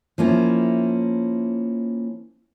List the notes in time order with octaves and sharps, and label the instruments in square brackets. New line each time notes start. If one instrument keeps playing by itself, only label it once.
[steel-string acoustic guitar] F3 A#3 C#4 E4